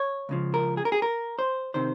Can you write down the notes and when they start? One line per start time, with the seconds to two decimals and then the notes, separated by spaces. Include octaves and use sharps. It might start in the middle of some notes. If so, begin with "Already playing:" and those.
Already playing: C#5
0.29 C#2 C#3 F3
0.54 A#4
0.77 G#4
0.85 A#4
0.92 G#4
1.02 A#4
1.39 C5
1.74 C3 D#3 C5